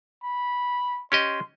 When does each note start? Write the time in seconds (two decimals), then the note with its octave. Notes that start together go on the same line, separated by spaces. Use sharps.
0.23 B5
1.12 C#4 G4 D#5 C6